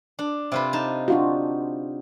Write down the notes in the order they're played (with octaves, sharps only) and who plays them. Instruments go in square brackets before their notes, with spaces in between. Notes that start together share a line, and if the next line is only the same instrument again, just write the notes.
[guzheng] D4
C3 F4 B4
D#4 A5
[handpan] D4 F4 F#4